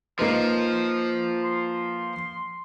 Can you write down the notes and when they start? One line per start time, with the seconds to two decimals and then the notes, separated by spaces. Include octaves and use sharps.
0.19 F3 A#3 D#4 B4 C6
1.44 C6